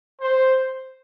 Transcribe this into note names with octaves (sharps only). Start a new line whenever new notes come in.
C5